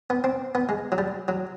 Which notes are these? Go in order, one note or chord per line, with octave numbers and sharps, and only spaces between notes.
B3
C4
B3
G#3
F#3
G3
F#3